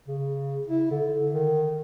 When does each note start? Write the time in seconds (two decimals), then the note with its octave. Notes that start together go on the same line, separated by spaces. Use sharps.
0.08 C#3
0.67 E4
0.91 D3
1.33 D#3